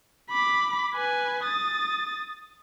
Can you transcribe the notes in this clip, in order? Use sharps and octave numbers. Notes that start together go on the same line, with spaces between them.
B5 D6
B4 G#5
D#6 A6